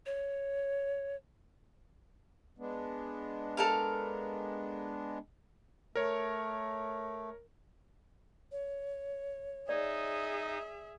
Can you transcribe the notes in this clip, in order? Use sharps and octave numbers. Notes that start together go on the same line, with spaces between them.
C#5
G#3 B3 D4
A4 A#4 F5
A3 A#4 C#5
C#5
D#4 G#4 D5 E5